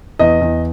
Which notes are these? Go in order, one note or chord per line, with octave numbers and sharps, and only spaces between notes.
E2 D#5
E2